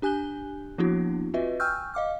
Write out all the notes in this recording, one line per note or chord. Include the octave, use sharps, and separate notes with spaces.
D4 G4 G#5 F#6 G6 G7
F3 A#3 B3 D4 E4 F#4
C4 F4 F#4 B4 D#5 E5
G5 G#5 C#6 E6 F6 G6
D#5 F5 D6 F6